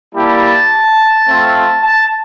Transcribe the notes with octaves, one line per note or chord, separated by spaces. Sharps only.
G3 A#3 E4 G4 A5
A3 C4 F4
A5